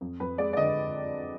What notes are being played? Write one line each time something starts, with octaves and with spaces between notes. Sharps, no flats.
F2
F2 B4
G#3 D5
D5
D3 D#5